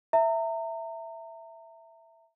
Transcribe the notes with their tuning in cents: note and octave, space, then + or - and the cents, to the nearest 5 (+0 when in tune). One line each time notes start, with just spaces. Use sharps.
E5 +0 A#5 -35